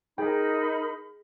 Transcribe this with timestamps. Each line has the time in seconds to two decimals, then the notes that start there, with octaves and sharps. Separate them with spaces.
0.18 D#4 G#4 A#4 G5 B5